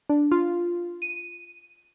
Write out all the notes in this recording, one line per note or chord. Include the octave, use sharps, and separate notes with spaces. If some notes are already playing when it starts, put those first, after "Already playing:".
D4
F4
D#7